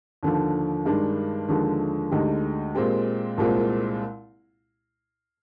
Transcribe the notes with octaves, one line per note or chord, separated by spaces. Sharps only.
D#2 D3 F3
G2 D#3 G#3 D4
D#2 D3 F3 G#3
D2 D3 G#3 D#4 G4
A#2 G#3 C4 G4
C2 A#2 G#3 C4 F4